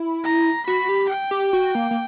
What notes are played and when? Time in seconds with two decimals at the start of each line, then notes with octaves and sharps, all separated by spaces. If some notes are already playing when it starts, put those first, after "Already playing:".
Already playing: E4
0.24 A#5
0.67 F#4 B5
0.89 G4
1.09 G5
1.31 G4
1.53 F#4
1.75 A#3
1.91 A#3